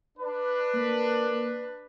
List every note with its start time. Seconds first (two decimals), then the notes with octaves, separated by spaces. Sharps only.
0.18 D4 B4
0.74 A#3